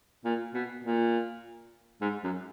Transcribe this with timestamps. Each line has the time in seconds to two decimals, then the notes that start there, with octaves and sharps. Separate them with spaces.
0.25 A#2
0.54 B2
0.84 A#2
2.01 G#2
2.24 F#2